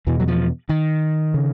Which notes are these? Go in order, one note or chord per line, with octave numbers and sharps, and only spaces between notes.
E2 B2 E3
F#3
F3
D#3
C#3